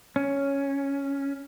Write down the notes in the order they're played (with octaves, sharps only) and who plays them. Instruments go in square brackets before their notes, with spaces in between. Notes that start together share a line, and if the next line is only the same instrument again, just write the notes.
[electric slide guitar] C#4